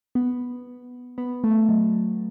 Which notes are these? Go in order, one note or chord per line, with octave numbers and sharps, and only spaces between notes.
B3
B3
A3
F#3